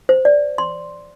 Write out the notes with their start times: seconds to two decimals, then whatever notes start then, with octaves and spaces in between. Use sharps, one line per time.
0.09 C5
0.25 D5
0.58 C6